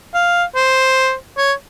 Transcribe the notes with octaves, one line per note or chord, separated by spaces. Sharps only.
F5
C5
C#5